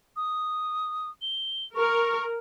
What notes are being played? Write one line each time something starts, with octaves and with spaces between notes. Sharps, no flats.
D#6
G7
A#4 C#6